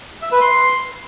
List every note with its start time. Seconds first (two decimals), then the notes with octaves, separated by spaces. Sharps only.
0.22 E5
0.32 B4
0.41 C6